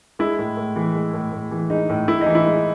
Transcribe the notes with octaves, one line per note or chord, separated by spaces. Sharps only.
G#3 E4
A2
A2
E3
G#3
A2
A2
E3
G#3 D#4
A2
A2 E4
D#4
E3
E4
G#3